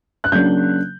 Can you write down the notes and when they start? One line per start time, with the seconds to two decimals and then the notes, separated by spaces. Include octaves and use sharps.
0.24 F#6
0.32 C#3 F#3 A#3 D4 G6